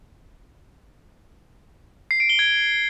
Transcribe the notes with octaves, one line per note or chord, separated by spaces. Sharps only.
C7
D7
G7
G#6